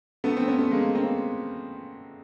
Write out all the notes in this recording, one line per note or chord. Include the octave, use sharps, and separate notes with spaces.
A3 B3
C4
B3 C#4
A3
G#3 A#3
A#3 C4